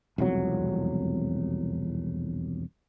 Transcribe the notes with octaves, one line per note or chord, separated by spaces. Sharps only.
E1 C2 F2 F#3